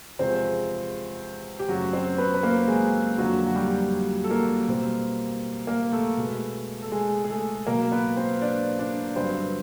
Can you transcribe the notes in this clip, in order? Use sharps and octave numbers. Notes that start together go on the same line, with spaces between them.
E2 C3 F3 G#3 C4 C5
G4
F#2 C#3 F#3 A3 F#4
C4 C5
B3 B4
B4
A#3 A#4
G#3 G#4
F2 D3 F#3 A#3 F#4
F#4
G3 G4
A4
A#3 A#4
B2 G3 C4
A#3 A#4
A3 A4
B2 G#3 B3
A4
G#3 G#4
G#4
A3 A4
B2 F#3 A#3 A#4
B3 B4
C4 C5
D4 D5
D4 D5
G2 D3 F#3 B3 C4 C5